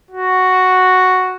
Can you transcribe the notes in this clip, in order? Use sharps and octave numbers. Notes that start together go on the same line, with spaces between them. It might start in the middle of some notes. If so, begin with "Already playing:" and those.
F#4